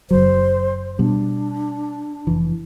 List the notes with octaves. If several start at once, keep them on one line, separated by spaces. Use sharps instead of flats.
F#1 F#3 C5
B2 G3 D4
F1 E3